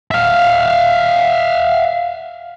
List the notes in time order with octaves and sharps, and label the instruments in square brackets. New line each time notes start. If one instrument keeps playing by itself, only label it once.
[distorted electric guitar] E5 F5